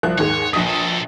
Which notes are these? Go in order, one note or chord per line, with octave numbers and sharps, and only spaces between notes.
C2 F3 F#6
D#2 G#2 G#3 C#5
A#1 F2 B2 D#6
B2 A4